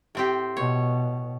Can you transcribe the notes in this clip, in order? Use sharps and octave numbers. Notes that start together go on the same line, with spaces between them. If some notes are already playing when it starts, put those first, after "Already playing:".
A2 C4 G4
B2 C#5